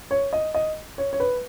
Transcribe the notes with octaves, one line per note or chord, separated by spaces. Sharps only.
C#5
D#5
D#5
C#5
C#5
B4